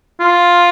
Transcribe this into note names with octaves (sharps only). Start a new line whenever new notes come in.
F4